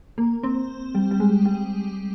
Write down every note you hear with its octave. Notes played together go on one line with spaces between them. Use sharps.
A#3
C4
G3
G3
G#3
G3